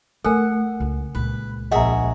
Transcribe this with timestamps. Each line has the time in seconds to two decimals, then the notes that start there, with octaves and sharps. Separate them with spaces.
0.25 A3 A4 A#4 F#5 G#5
0.80 C#2
1.15 C#2 A#2 B4
1.72 A#1 F#4 G#4 D#5 E5 A#5